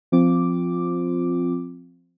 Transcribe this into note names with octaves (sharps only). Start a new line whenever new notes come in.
F3 C4 F4 D6